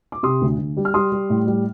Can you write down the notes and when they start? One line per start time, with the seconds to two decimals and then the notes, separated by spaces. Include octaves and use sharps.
0.12 D6
0.23 C3 C6 D#6
0.41 D2
0.58 D2
0.77 G3
0.85 F6
0.94 G3 C6 D#6
1.12 G3
1.30 A2
1.47 G3